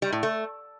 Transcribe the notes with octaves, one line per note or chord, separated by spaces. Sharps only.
G3
A2
A3